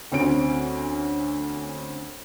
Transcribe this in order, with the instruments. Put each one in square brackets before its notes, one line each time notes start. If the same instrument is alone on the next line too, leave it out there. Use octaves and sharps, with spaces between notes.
[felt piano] D2 C4 C#4 D7